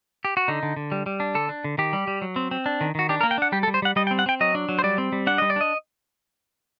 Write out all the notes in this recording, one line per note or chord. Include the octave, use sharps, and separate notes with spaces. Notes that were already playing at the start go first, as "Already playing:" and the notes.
G4
F#4
D3 D#4
D3
D3
G3
G3
D4
D3 A4
D4
D3
D#3 G4
G3
G3
F#3
C4
C4
D4
D#3
D#3 F#4
D4 G4
A#4
A#3
G5
D4 F#5
G3 G4
A4
G3
C5
G3 F#5
G3 D#5
G5
C4
F#5
C4 G5
F#3 D#5
D4
F#3
C5
G3 D5
C4
G3
D4 F#5
G3 D#5
D5
D4 D#5